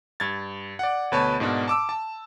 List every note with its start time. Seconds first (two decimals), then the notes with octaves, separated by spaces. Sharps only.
0.20 G2 G#6 A6
0.79 D5 F#5
1.12 D2 B2 B4 C#5 A5
1.40 G#2 B2 A#3 D4
1.68 A5 D6 E6
1.89 A5